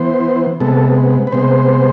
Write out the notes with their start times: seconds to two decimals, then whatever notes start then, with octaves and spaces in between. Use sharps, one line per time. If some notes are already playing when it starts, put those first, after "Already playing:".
Already playing: E3 B3 C5
0.60 C3 G#3 B3 A4
1.27 B4
1.32 C3 G#3 B3 C5